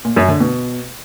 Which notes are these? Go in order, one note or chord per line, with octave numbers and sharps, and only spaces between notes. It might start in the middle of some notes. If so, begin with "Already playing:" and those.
A#2
F#2
D3
B2